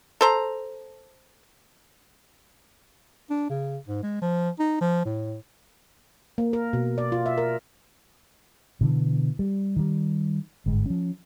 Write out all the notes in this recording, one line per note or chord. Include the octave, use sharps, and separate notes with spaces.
A4 C5 A#5
D4
C#3
G#2
G#3
F3
D#4
F3
A2
A#3
A#4
B2
D5
F4
E5
A#4
B2 D3 E3
G3
D#3 G3
G1 G#2 G#3
F3 C#4